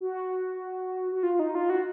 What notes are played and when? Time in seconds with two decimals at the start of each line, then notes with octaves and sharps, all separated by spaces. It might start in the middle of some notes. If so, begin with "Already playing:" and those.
0.01 F#4
1.12 F#4
1.23 F4
1.39 D#4
1.55 F4
1.70 F#4